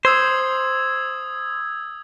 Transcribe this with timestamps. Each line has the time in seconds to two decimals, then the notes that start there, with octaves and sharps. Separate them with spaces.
0.05 C5 D#6 E6 G#6